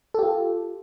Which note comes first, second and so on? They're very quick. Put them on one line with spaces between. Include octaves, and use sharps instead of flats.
A4 G4 F4